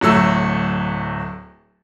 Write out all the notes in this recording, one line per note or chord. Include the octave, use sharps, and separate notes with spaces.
D1 F#3 A3 E6